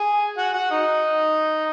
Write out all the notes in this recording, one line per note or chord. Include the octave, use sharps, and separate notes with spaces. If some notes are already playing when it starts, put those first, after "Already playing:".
Already playing: G#4 G#5
F#4 F#5
F#4 F#5
D#4 D#5